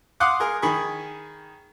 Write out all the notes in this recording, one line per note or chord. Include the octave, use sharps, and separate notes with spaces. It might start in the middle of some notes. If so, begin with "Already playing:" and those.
F5 F#5 C6 D6 D#6 F#6
G#4 A#4
D#3 G#4 B5 C#6